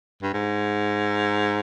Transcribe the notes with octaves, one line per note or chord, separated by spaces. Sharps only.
G2
G#2